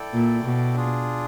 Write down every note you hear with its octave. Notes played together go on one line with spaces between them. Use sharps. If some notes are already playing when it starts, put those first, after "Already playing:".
Already playing: E4 A4 D5 G5
A#2
B2
D4 F4 G#4